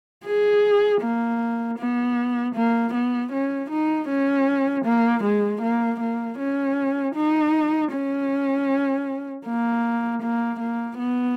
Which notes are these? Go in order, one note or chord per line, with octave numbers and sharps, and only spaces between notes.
G#4
A#3
B3
A#3
B3
C#4
D#4
C#4
A#3
G#3
A#3
A#3
C#4
D#4
C#4
A#3
A#3
A#3
B3